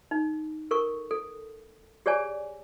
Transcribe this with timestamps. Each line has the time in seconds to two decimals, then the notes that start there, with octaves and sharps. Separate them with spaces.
0.11 D#4
0.71 A4 A#4 C#6
1.11 A4
2.06 G4 G#4 C#5 D5 G#5